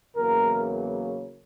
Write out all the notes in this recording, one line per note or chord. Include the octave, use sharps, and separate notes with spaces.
E2 C#3 F#3 A#3 A#4